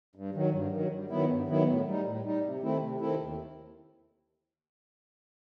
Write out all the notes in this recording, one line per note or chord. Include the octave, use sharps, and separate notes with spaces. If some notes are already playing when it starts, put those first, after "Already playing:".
G2
D#3 F#3
G2
D#3
F#3
G2
D#3 F#3 B3 E4
G2
D#3 F#3 B3 E4
A2
G3 D#4
A2
G3 D#4
C3
D#3 A3 C4 E4
C3
D#3 A3 C4 E4
D#2